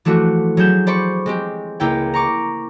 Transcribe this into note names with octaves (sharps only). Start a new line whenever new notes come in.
E3 F3 A3 D4 F#4
F#3 G#4 G6 E7
C5 D5 B5 C#6
G#3 C4 G4
C#2 A#3 E4 G5
A#5 C#6 D6